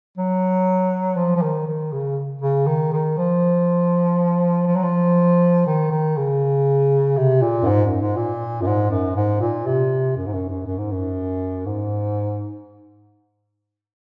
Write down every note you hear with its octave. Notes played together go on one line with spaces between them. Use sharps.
F#3
F3
F3
D#3
D#3
C#3
C#3
D#3
D#3
F3
F3
F#3
F3
D#3
D#3
C#3
C3
A#2
F#2
G#2
F#2
G#2
A#2
F#2
G#2
F#2
G#2
A#2
C3
F#2
G#2
F#2
F#2
F#2
G#2
F#2
G#2